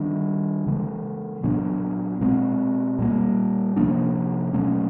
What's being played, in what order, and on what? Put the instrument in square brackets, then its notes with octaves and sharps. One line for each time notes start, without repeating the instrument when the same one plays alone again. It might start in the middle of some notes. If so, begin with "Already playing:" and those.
Already playing: [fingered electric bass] D#3 G3 D4
C#3 E3 G#3
A#2 F#3 B3 D4
B2 G#3 C4
A#2 G3 A#3
C3 F3 A#3 D4
B2 F#3 A3 C#4